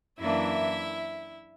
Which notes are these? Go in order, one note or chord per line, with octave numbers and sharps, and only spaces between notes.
F#2 E3 A#3 D4 E4 E5